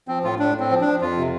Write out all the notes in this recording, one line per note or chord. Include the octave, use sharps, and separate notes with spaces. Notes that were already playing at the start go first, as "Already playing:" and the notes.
F3 C4
A2 F4
A2 D4
A2 C4
F3
D4
F3
F2 F4
C3